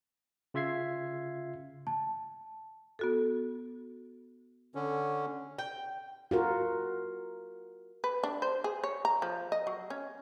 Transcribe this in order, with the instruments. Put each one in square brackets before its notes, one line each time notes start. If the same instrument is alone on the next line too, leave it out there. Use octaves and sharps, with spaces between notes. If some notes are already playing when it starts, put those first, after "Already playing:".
[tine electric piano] C#3 F4 E5 G#6 C7
[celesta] A5
[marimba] B3 F#4 A4
[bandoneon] D3 C#4
[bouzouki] G5
[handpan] F4 F#4 A#4
[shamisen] B4
D4
C5
G#4
C#5
A#5
F3
D#5
F#3
C#4